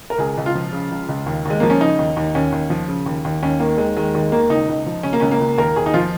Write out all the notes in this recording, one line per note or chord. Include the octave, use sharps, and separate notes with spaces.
A#4
C#2 G#4
C#2
F4
F3
C#3
C#2
C#2
D#2
D#2 G#3
F3 A#3
C#4
C#3 D#4
D#2
D#2
D#2 C#4
D#2
F3
C#3
D#2
D#2
D#2 C#4
D#3 A#3
D#2 G#3
D#3 G#3
D#2 G#3
D#3 A#3
C#2 D#4
C#2
F3
C#3 C#4
A#3
C#2 C#4
A#3
C#2
D#2 A#4
D#2 G#4
D#4
F3 F4